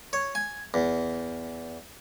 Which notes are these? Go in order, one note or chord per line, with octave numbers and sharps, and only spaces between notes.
C#5
G#5
E2